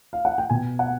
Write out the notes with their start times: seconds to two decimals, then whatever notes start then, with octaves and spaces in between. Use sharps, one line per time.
0.13 F5
0.25 F#5
0.38 G5
0.49 B2 G#5
0.79 F#5